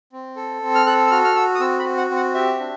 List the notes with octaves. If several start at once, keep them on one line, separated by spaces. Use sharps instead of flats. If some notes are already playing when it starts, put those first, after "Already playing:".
C4
A4
C4
F6
A4 F#6
E6
F#4 F6
F6
F#4 E6
D#6
C4 E6
B5
F#4
F#5
C4
F#5
G4 E5
D4